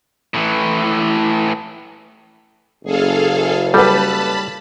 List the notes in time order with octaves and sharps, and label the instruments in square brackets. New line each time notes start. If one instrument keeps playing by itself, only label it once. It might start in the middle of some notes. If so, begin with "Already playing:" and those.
[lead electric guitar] A2 E3
[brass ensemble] F#1 [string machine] G#4 A4 F5
[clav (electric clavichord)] G3 [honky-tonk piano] A4 B4 [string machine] A5 B5